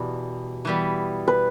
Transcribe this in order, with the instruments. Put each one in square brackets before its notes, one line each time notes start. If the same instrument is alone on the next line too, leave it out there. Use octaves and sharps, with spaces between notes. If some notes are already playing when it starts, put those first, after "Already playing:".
Already playing: [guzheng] E2 B2 G3
E3 G3 B3
[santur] B4